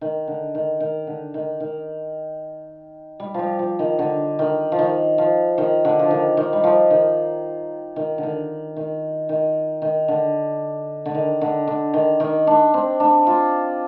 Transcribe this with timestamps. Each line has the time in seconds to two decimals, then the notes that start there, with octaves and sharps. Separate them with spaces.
0.01 D#3
0.28 D3
0.55 D#3
0.80 D#3
1.07 D3
1.34 D#3
1.60 D#3
3.20 G3
3.34 F3 G3
3.59 F3
3.79 D#3
3.99 D3
4.39 D#3
4.72 F3
4.79 D#3
5.18 F3
5.58 D#3
5.85 D3
5.99 F3
6.11 D#3
6.37 D#3
6.53 G3
6.64 F3
6.90 D#3
7.96 D#3
8.18 D3
8.23 D#3
8.76 D#3
9.29 D#3
9.82 D#3
10.08 D3
11.05 D3
11.15 D#3
11.41 D3
11.68 D3
11.94 D#3
12.20 D#3
12.47 D4
12.74 C4
13.00 D4
13.27 F4